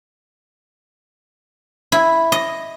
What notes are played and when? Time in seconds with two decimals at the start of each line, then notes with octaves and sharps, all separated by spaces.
1.92 E4
2.32 D#5